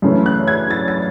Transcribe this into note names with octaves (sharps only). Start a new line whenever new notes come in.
F#2 C#3 E3 A3 C#4
F#6
G#6
A6
A6